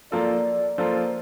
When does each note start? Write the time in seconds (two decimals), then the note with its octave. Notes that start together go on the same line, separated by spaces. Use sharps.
0.12 F3 A#3 F4 A4 D5
0.78 F3 A#3 F4 A4 C5